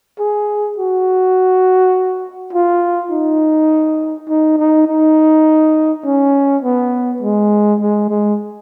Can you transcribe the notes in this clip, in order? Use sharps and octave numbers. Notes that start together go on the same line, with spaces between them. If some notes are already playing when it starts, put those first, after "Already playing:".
G#4
F#4
F4
D#4
D#4
D#4
D#4
C#4
B3
G#3
G#3
G#3